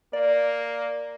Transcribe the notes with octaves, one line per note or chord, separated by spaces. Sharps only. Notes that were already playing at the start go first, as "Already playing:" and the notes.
A#3 D5